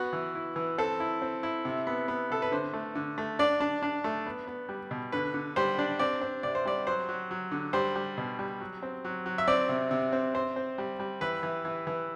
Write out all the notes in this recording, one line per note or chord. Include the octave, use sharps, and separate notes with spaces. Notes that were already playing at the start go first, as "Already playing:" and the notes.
Already playing: B3 F#4
E3
E4
E3
C4 A4
E4
C4
E4
C3
B3
B3
C3 A4
B4
D3 C5
A3
D3
A3
D4 D5
D4
D4
A3
B3
B3
G3
B2
D3 B4
D3
G3 C5
D4
C4 D5
C4
C3 D5
C5
G3 D5
F#3 C5
F#3
F#3
D3
G3 C5
G3
B2
G3
F#3
C4
F#3
F#3
E5
C4 D5
C3
C3
C4
C4 C5
C4
G3
G3
E3 B4
E3
E3
E3